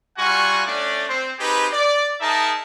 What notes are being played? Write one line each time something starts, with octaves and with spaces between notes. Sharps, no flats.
G3 F4 F#4 F#5 G#5 C#6
A3 C#4 D4 D5
C4 C5
C4 D#4 G4 G#4 B4
D5
D#4 G#4 A#4 E5 A5